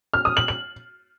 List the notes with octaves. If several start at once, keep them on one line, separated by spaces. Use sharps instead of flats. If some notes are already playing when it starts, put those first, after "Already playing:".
F6
D#6
F#7
F#7